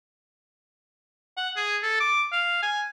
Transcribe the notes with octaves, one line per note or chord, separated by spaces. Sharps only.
F#5
G#4
A4
D6
F5
G#5